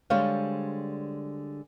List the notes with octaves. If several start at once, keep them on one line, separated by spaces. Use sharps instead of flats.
D3 G3 G#3 C5 C#5 F5